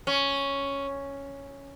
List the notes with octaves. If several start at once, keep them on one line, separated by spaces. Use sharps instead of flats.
C#4